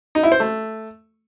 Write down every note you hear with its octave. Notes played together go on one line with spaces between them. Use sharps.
D#4
E4
C5
A3